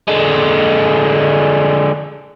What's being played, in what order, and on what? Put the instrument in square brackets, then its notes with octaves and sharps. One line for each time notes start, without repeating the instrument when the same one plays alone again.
[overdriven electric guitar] D3 G#3